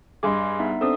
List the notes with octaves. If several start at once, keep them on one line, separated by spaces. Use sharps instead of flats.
G2 G#4 D#5 C6 D6
B3 D#4 E5
C4 D4 A4 D#6